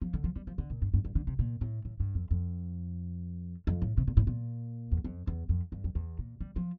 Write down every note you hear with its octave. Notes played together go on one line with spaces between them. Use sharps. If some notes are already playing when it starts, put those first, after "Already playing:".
F3
D3
F3
G3
F3
D3
A#2
G2
G2
G2
D3
C3
A#2
A2
A2
G2
F2
F2
F2
A2
C3
A#2
A2
A#2
E2
F2
E2
F2
G2
F2
E2
A#2
G3
F3